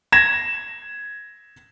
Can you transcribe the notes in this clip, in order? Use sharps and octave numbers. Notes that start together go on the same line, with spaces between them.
G#6 A#6 E7